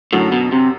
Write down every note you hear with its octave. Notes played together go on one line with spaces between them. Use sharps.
F#2 A2 D3 F#3
B2
C3